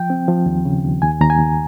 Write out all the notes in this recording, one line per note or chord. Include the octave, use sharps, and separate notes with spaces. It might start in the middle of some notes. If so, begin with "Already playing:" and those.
Already playing: F3 G5
C4
F3
D#2
C#3
D#2
D#2 G#5
D#2 A#5
G#5
D#2